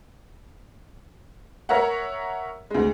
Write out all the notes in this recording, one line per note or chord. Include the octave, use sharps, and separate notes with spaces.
A#4 C#5 E5 F#5
D2 G#3